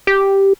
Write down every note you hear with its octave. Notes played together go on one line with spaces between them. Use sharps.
G4